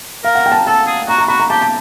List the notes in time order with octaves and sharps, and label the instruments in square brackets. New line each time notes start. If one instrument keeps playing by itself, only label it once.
[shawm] A#4 [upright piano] F5
[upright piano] F#5
G5
A5
A#5
[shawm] A4 [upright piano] A5
[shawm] G#4
[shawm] F#4 [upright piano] A#5
[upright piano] A#5
[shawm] F#4 [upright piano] B5
[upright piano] A#5
[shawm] G4 [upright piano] A5
[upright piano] A5